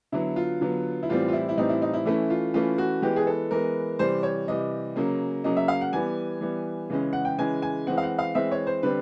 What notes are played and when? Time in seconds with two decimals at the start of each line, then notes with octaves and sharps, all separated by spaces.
0.12 D3 F#3 B3 E4
0.36 F4
0.61 D3 F#3 B3
1.03 E4
1.09 A2 E3 G3 C4 F4
1.28 F4
1.33 E4
1.49 E4
1.57 A2 E3 G3 C4 D#4
1.69 E4
1.82 D#4
1.93 E4
2.05 E3 A3 C#4 E4
2.30 F4
2.54 E3 A3 C#4 F4
2.78 F#4
3.02 E3 G#3 B3 G4
3.16 G#4
3.27 A4
3.51 E3 G#3 B3 A#4
3.99 C3 E3 G3 C5
4.23 C#5
4.48 C3 E3 G3 D#5
4.96 C#3 F#3 A#3 C#4
5.44 C#3 F#3 A#3 C#4 D#5
5.57 E5
5.68 F5
5.81 F#5
5.93 E3 G3 B3 G#5
6.41 E3 G3 B3
6.90 C#3 E3 G#3 C#4
7.13 F#5
7.25 G5
7.38 C#3 E3 G#3 C#4 G#5
7.62 G#5
7.87 E3 G#3 C4 F#5
7.98 F5
8.03 F#5
8.19 F5
8.35 E3 G#3 C4 E5
8.52 C#5
8.67 C5
8.83 D3 G3 C4 B4